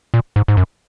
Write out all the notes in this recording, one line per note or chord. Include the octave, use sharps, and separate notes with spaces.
A#2
G#2
G#2
F#2